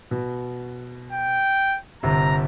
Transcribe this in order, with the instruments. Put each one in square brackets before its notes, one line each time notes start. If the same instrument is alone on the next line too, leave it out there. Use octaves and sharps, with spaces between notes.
[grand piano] B2
[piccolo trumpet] G5
[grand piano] G1 C3 [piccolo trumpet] A#5